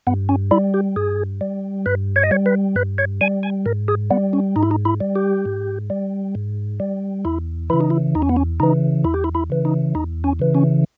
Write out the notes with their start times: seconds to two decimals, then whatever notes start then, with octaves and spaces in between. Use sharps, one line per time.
0.07 G2 B3
0.29 C#4
0.51 G3 E4
0.74 G4
0.96 G2 G#4
1.41 G3
1.86 G2 B4
2.16 C#5
2.23 D#5
2.31 G3 C#5
2.46 B4
2.76 G2 B4
2.98 C#5
3.21 G3 G#5
3.43 G#5
3.66 G#2 A#4
3.88 G#4
4.11 G3 B3
4.33 C#4
4.56 G#2 D#4
4.63 E4
4.71 D#4
4.85 E4
5.00 G3
5.16 G4
5.45 G#2
5.90 G3
6.35 G#2
6.80 G3
7.25 E2 E4
7.70 C#3 E3 E4
7.81 D#4
7.90 E4
8.15 E2 D#4
8.22 C#4
8.29 B3
8.36 C#4
8.60 C#3 E3 D#4
9.05 E2 E4
9.14 G4
9.24 E4
9.35 E4
9.50 C#3 E3
9.65 D#4
9.95 E2 D#4
10.24 C#4
10.39 C#3 E3
10.55 C#4